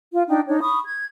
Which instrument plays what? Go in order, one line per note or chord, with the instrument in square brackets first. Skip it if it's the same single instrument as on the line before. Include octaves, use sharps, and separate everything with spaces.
[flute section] F4
D4 D#4 G5
D4 D#4 C#5
B5 C#6 D#6
G#6